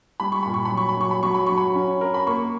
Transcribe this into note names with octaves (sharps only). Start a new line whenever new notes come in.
G3 B5
C#6
A#2 B5
C#6
B5
F#3
C#6
B5
F#3 C#6
B5
F#3 C#6
B5
F#3 C#6
B5
C#4
A#4
B5
A#3 C#6